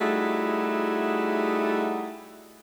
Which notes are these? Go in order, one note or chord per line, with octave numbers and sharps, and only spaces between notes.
G3 A3 D#4 E4 F#4 G#4